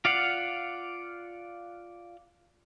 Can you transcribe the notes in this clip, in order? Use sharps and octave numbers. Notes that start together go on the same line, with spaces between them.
F4 D5 F5 F#5